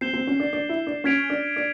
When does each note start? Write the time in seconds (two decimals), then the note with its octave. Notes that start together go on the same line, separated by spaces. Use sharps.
0.01 C4 G6 C7 E7 G7
0.13 C4
0.27 C#4
0.40 D4
0.53 D4
0.69 E4
0.87 D4
1.04 C#4 F6 G#6 B6 D7 F7
1.30 D4
1.56 D4